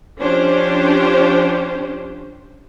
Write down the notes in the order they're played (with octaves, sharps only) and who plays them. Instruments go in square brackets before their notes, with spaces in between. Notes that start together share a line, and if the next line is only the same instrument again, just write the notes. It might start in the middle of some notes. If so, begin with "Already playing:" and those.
[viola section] F3 C#4 D4 G4 C5